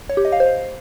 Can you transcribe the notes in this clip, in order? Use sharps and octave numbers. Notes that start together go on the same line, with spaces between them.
C#5
G4
D#5
F5
C5